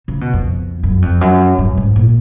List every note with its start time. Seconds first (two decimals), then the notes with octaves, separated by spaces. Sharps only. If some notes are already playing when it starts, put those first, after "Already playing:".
0.08 C#3
0.21 B2
0.33 F2
0.83 F#2
1.02 F2
1.21 F#2
1.59 G2
1.77 G#2
1.96 A#2